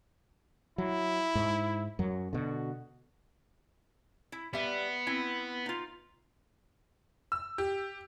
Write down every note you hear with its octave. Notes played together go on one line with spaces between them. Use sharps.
F#3 E4
G#2
F#2 F#3
B2 D3 F#4
E4
G3 B3 E5
C4 E4
D#4 F4
E6
G4